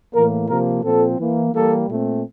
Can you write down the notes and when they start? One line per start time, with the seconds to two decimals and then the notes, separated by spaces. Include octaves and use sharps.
0.14 A2 E3 A#3 A#4
0.48 C3 F3 A#3 A#4
0.83 A#2 F3 C4 A4
1.18 E3 A#3
1.52 E3 G3 A#3 A4
1.88 A#2 A3 C4